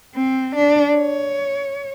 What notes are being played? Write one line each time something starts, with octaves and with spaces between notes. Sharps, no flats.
C4
D4
C#5